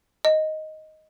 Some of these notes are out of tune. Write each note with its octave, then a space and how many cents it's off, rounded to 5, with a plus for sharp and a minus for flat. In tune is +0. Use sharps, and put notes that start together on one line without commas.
D#5 +5